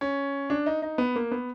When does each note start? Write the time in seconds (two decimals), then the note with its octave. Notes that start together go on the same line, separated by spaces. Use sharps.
0.01 C#4
0.50 D4
0.66 D#4
0.82 D#4
0.98 B3
1.16 A#3
1.31 B3